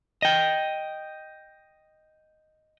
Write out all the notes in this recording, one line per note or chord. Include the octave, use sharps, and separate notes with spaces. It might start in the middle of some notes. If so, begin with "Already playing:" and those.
D#5 G5